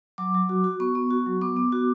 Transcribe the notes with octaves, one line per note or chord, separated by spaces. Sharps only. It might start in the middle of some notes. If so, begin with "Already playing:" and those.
F#3 D6
F#3
F#4
F#4
B3 C#6
B3
F#4
F#3
B3 D6
B3
F#4